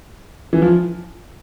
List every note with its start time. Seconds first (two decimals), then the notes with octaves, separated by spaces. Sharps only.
0.53 E3
0.62 F3